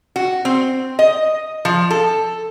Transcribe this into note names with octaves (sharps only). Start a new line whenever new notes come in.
F#4
C4
D#5
F3
A4